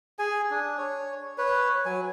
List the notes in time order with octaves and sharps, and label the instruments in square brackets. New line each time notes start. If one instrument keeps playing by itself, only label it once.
[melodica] G#4 G#5
D4
C#5
B4 C#5
F#3 G#5